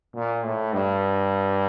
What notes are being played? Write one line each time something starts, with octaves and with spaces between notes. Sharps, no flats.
A#2
A2
G2